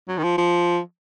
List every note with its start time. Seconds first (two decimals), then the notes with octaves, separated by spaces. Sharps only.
0.08 F#3
0.18 D#3
0.23 F3
0.38 F3